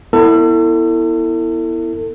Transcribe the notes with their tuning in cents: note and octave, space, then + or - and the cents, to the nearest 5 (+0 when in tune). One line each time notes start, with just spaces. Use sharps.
B3 +0 E4 +0 A4 +35